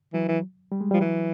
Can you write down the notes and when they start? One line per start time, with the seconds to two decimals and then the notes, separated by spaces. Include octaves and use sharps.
0.13 E3 F#3
0.28 E3
0.72 G3
0.81 G#3
0.91 G3
0.94 F3
1.00 E3 F#3